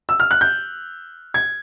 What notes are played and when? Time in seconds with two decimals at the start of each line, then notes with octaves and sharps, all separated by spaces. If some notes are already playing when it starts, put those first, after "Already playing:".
0.09 E6
0.20 F6
0.31 F#6
0.41 G6
1.34 G#6